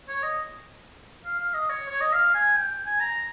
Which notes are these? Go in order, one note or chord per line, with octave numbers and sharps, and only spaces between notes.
C#5
D#5
F5
F5
D#5
C#5
C#5
D#5
F5
G#5
G5
G#5
A#5